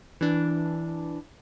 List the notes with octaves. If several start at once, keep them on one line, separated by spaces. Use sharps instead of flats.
E3 D4